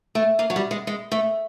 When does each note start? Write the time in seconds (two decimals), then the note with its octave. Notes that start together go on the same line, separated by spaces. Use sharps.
0.15 A3
0.39 A#3
0.50 F#3
0.56 G3
0.71 G#3
0.87 G#3
1.12 A3